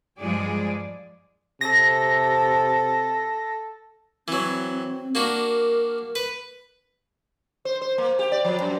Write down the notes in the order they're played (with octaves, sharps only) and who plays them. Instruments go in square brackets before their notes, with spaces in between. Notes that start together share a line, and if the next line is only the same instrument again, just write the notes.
[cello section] G2 F3 G3 G#3 G#4 D5
[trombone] C3 [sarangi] A4 [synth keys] A#6
[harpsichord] E3 F#3 [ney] C4
[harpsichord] A#3 D4 F#4 [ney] A#4
[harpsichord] B4
[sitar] C5
C5
A#3
G4
D5
F3
F#2